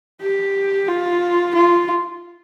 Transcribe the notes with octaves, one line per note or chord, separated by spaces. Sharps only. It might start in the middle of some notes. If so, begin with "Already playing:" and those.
G4
F4
F4